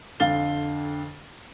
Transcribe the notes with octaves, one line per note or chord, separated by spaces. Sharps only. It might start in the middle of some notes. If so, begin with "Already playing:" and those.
F2 D3 F5 A6 G7